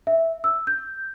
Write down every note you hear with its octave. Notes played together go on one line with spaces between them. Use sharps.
E5
E6
G6